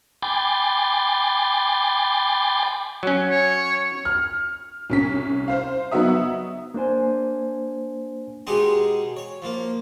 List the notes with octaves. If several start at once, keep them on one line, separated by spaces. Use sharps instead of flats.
G5 G#5 B5 C6 D6 A6
F#3 C#4
C#5
F6
C2 C#4 B6
C5 F5
F#3 B3 D#4 F#4 E5 D#6
A#3 D4 C5 G#5
B2 G#3 D#4 G4 G#4 C6
C#5
F3 A#3